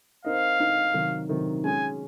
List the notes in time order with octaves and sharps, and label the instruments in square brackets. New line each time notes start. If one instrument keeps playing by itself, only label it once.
[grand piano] C4 D#4 A#4 D#5 [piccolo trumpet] F5
[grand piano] C4 D#4 A#4 D#5
C3 D#3 F#3
C3 D#3 F#3
[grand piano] G#3 C#4 G#4 [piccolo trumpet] G#5